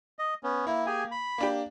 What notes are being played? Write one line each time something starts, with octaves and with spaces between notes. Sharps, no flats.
D#5
B3 C#4
A#3 E4
G4 G#4 G#5
B5
A#3 D4 G4